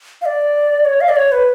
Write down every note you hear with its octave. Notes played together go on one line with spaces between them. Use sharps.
F5
D5
C#5
F5
D5
C#5
B4